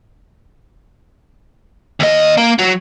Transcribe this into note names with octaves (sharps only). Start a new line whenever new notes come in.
D#2 D#5
A#3
F#3